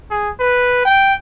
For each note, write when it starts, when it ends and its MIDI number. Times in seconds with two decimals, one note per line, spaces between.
0.11 0.30 68
0.40 0.84 71
0.85 1.14 79